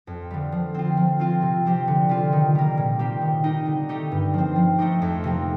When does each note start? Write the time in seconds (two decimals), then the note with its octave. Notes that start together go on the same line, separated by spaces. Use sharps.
0.07 F2
0.31 D3 G3
0.52 F3
0.74 C4 F4
0.97 F3
1.20 C4 F4
1.42 C3
1.65 F3 C4 G4
1.88 D3
2.09 G3 C4 F4
2.33 D#3
2.55 G3 A#3
2.77 A#2
2.99 G3 C4 G4
3.22 D#3
3.44 A#3 D#4 G4
3.66 D3
3.89 A3 D#4 G4
4.12 G2
4.34 F3 C4
4.56 F3
4.78 A3 D#4 G4
5.02 F2
5.24 C3 F3 A#3